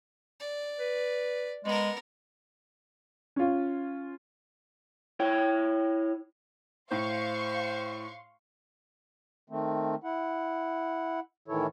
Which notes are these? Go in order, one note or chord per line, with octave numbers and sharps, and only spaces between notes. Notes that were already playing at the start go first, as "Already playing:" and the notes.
D5
B4
G#3 B3 A#4
C#4 F4
E4 C#5 G5
A2 C5 F5 C6 C#6
D#3 A3 C4
E4 F#5
A2 D#3 E3 E4 A4 C#5